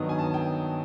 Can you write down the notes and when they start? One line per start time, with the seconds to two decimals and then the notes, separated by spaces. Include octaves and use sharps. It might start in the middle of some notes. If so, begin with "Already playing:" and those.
Already playing: G2 D#3 F#3 B3 D#4
0.09 G#5
0.18 A5
0.34 G5